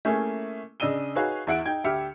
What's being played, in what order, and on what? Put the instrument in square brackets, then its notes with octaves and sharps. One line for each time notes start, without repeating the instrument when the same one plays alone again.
[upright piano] A3 A#3 C#4 E4 G#4
C#3 D4 D#5 E6 D#7 G7
D#4 F#4 G#4 B4 C#5 F5
E2 E4 F#5 D7
D#4 G5 G#6
D2 G4 E5 F6 C#7